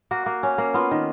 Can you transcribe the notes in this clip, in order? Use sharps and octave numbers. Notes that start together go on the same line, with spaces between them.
A#3 F#4
A#3
C#4
A#3
B3 F4
D#3